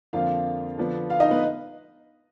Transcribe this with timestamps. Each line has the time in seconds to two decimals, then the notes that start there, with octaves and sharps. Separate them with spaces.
0.13 F2 D3 F3 A#3 D4 F4 F5
0.77 D3 F3 B3 D4
1.10 F4 F5
1.20 D#4 D#5
1.31 B3 B4